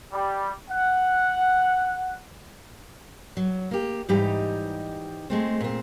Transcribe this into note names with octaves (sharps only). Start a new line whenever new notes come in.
G3
F#5
F#3
A#3 G4
G#2 E3 G3 D#4 G4 D#5
G#3 A3 C4
A#2 C4